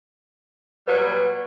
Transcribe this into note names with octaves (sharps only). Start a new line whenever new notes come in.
A#2 F#3 G3 B4